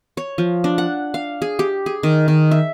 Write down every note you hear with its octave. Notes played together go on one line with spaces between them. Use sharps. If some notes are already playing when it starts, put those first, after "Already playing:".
C#5
F3
D4
F#5
F5
G#4
G4
G#4
D#3
D#3
E5